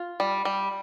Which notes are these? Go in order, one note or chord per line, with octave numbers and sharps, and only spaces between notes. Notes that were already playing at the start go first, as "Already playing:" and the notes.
Already playing: F4
G3
G3